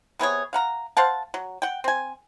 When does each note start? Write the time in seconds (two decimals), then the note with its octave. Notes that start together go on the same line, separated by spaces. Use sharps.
0.19 C3 B3 G#4 C#5
0.53 F5 F#5 A#5
0.97 C5 F5 F#5 A5
1.34 F#3
1.62 F#5 G5
1.84 C4 G#5